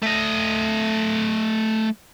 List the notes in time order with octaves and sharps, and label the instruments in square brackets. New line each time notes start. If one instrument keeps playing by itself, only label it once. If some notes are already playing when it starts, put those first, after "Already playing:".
[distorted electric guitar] A3 D#5